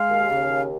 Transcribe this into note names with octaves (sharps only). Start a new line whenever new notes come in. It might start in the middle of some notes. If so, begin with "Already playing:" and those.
Already playing: G#3 F5
D#2
C#3
D#2